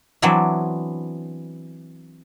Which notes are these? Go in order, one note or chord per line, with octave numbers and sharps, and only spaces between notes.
E3 F#3 B3 C4 D4 E4